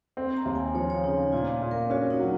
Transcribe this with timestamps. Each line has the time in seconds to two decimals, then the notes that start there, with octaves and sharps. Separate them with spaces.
0.17 C4
0.37 A#5
0.46 D#2
0.55 G#5
0.75 F3 C#5
0.90 C#5
1.04 C#3 D#4
1.32 A#2 F4
1.62 A#2
1.71 A#4
1.90 C#4 F#4
2.10 D#4
2.20 F#3